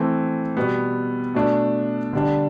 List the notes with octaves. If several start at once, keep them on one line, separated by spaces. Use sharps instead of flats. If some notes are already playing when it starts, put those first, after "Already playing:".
Already playing: E3 A3 C4
B2 G3 B3
B2 A3 D4
D3 G3 D4